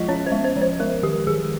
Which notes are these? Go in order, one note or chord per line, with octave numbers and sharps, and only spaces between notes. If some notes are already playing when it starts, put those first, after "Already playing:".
Already playing: F3 G#3 F4 D#5
C#4 C#5
C5
G#3
C5
F3
C5
G#3 A#4
D#3 G4
D#3 G#4